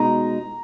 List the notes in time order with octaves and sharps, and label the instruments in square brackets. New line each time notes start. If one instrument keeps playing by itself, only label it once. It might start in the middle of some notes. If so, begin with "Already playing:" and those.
Already playing: [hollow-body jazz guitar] B2 G#3 D#4 [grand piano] A#5